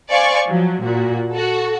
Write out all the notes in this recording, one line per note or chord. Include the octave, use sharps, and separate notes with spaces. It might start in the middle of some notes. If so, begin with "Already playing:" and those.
C5 D5 F5 G#5 C#6
F3 F#3
A#2 F#4
F#4 A4